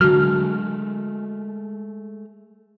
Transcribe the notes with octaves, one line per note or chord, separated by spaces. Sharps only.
D3 F#3 G#3 A3 F#4 A#4 F6